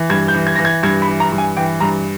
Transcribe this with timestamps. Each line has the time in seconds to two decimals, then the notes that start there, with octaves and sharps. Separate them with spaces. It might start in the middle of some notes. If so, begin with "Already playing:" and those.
Already playing: E3
0.10 G2 G#6
0.28 G6
0.34 E3
0.47 G#6
0.56 E3 A#6
0.65 G#6
0.83 G2 G#6
1.02 B5
1.08 E3
1.20 A#5
1.32 G2
1.38 G#5
1.57 E3 G5
1.80 G2 A#5